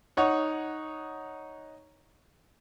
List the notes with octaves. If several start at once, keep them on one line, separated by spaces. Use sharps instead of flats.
D#4 C#5 F#5